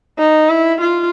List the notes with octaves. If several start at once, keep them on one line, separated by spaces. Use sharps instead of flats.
D#4
E4
F4